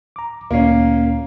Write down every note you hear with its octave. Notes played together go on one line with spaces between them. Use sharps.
A#5 D6
D2 A#2 A#3 C#4 C7